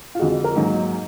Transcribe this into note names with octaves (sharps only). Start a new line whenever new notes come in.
F4
F2 D3 G#3 F#4
A#4
G#2 F#3 A#3 D#4